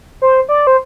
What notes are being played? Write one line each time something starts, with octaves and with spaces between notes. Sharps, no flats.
C5
D5
C5